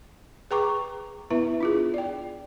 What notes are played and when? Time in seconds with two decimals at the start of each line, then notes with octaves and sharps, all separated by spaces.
0.51 G#4 B4 G5 A#5 C#6 D6
1.31 B3 E4 B4 E5
1.61 D4 F4 G#4
1.94 D5 G5